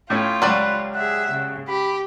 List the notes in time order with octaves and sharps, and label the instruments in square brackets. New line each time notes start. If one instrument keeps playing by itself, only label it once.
[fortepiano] A2 A3 C#4 [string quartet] F4 [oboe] G5
[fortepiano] C#2 [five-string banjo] F#3 G3 D5 [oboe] B4
[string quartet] G#4 E5 [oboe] F#5
[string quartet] C#3
[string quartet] G4 [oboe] B5